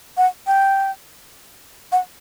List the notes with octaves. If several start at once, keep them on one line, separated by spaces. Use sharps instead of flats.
F#5
G5
F#5